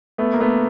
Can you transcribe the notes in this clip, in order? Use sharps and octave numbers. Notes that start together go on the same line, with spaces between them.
A3 B3
A#3
A3 B3